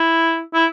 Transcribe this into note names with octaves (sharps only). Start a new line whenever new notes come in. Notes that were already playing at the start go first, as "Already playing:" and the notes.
Already playing: E4
E4